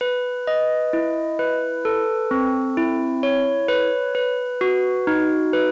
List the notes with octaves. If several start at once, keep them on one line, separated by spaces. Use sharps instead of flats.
B4
D#5
E4
B4
A4
C4
E4
C#5
B4
B4
F#4
D#4
B4